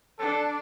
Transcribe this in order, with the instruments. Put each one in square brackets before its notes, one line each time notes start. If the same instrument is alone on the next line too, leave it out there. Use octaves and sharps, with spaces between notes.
[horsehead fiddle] D4 [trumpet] A4